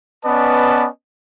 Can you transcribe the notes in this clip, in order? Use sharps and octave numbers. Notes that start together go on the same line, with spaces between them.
B3 C#4 B4 D5 D#5 A5